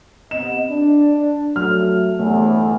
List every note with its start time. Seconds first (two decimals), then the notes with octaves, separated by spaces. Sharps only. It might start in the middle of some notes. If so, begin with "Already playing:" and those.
0.31 C3 B3 D#5 E7
0.70 D4
1.56 F#3 A3 F6
2.19 G1 E2 A3